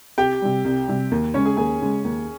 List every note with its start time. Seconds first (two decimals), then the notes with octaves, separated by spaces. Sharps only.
0.18 C2 G4 G5
0.42 C3 G3
0.64 C2
0.88 C3 G3
1.11 D#2
1.34 C#3 G#3 C#4 C#5
1.46 G#4 G#5
1.57 D#2 G#4 G#5
1.81 C#3 G#3
2.05 D#2